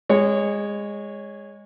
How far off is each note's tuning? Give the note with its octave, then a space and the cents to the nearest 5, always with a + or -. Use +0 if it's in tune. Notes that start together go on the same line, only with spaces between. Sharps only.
G#3 -20 C#5 +0